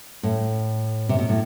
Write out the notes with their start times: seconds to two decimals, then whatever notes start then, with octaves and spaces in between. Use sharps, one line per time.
0.23 A2
1.09 C3
1.19 B2
1.29 A2